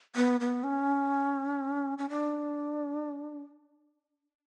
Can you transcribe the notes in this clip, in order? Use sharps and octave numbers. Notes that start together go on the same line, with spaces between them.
B3
B3
C#4
C#4
D4